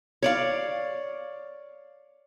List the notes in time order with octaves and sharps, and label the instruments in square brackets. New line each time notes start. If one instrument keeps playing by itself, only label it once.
[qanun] C#5 D5 F5